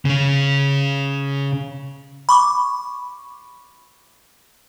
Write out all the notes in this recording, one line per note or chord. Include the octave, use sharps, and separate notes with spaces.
C#3 C#4
B5 C#6 D6